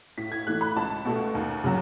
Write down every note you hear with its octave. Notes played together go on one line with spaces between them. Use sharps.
A2 B6
G#6
E3 A3 F#6
B5
C#2 A5
B2 A3
D#2
C#3 F#3